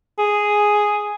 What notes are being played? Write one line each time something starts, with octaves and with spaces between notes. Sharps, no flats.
G#4